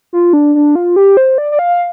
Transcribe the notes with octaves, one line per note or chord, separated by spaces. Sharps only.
F4
D4
D4
F4
G4
C5
D5
D5
F5